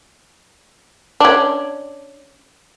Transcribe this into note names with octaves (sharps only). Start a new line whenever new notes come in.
C#4 D4